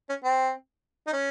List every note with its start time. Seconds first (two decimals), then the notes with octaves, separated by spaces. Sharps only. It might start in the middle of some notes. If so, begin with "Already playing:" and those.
0.09 C#4
0.23 C4
1.07 D#4
1.12 C#4